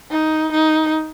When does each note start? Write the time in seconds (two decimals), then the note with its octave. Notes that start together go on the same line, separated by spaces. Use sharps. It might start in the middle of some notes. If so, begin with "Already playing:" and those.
0.10 D#4
0.51 D#4